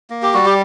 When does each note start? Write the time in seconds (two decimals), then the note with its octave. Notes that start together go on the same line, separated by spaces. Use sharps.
0.10 A#3
0.22 G4
0.34 G3 F#4
0.46 G4